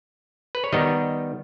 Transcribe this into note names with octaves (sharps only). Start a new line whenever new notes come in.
B4
C#5
D#3 G3 B3 D#4 D#5